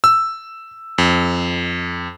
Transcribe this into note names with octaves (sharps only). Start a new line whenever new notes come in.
E6
F2